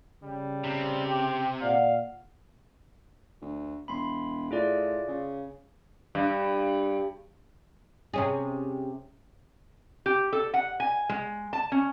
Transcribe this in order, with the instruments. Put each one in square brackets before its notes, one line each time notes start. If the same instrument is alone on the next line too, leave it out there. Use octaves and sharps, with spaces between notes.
[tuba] C#3 [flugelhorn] G3
[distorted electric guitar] C3
[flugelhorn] G4
[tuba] A#2 [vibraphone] D5 F#5 [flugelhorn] F5
[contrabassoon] D2
[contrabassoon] E1 [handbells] B5 C6
[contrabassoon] A2 [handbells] F4 G#4 D5
[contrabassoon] C#3
[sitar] G2
[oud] C3 C#4 G#4
[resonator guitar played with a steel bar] G4
A4
F#5
G#5
G#3
A5
C#4